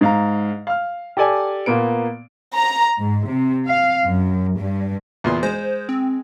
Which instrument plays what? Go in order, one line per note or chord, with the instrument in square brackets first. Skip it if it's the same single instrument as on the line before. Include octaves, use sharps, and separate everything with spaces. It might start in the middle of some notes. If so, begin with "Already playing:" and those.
[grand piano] G#2 F5 A#5
F5 F6
G4 A4 D5 G#5
A#2 A#3 B3 D7
[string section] A#5
G#2
C3
F5
F#2
G2
[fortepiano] E2 A#2 C6
[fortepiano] G#3 [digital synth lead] C5
[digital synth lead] C4